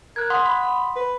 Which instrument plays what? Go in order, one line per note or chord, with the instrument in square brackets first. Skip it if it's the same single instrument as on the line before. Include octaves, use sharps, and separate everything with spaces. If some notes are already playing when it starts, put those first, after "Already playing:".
[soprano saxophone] A#4 [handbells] F#6 G#6
[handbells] F#5 C6 D#6
[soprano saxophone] B5
B4